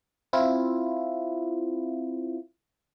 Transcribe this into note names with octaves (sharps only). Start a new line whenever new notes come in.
C4 E4 F4